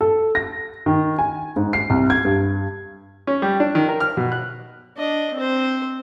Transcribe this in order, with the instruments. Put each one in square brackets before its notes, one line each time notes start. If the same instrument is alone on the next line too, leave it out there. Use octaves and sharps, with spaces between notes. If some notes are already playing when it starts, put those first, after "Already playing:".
[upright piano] A4
A#6
D#3
G#5
G#2
C7
C2
G#6
G2
[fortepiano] C#4
G3
D4
D#3
A#4
F6
B2
F#6
[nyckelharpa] D4 D#5
C4 C5